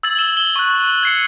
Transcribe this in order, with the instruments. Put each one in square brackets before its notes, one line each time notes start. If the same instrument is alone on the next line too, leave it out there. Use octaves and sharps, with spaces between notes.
[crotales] E6 G#6 A6 F#7
E7 G7
G7
C#6 F#6
F#7
G#6 C7 C#7